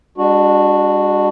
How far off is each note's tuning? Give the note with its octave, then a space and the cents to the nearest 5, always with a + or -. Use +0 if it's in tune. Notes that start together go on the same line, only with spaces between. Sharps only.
G#3 -45 D4 +0 F#4 -10